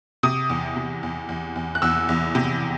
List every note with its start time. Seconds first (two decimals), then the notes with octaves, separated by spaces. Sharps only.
0.23 C3 D#6
0.50 E2
0.76 C3
1.03 E2
1.29 E2
1.56 E2
1.75 F#6
1.82 E2 E6
2.09 E2
2.35 C3